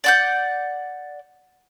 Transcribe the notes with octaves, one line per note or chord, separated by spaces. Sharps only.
D5 F#5 G6